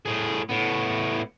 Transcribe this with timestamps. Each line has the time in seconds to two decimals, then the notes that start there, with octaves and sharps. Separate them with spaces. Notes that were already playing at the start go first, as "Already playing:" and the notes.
0.05 A2 G#4
0.49 A2 B3